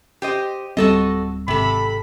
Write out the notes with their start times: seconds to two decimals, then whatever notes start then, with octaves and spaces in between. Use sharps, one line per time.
0.22 G4 C5 D#5
0.77 D1 G3 C4 F#4 A4 D#5
1.48 G#1 C3 A4 B5